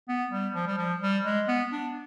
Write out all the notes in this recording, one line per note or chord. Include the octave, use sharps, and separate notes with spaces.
B3
G3
F3
G3
F3
G3
G#3
B3
D4